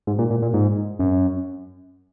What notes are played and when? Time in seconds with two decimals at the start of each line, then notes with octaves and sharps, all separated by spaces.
0.07 G#2
0.19 A#2
0.31 A#2
0.42 A#2
0.54 G#2
0.99 F#2